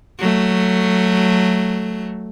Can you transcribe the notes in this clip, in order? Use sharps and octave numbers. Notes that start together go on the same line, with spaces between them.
F#3 A3